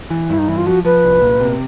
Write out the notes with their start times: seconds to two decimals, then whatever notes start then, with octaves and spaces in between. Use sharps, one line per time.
0.10 E3
0.30 G2 E4
0.38 D#4
0.48 E3 E4
0.57 F4
0.66 F3 F#4
0.85 F3 B4
1.04 C2
1.22 A#2
1.41 C3